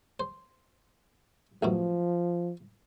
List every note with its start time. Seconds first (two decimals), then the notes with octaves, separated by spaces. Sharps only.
0.20 C5
1.63 A1 F#2 B2 F3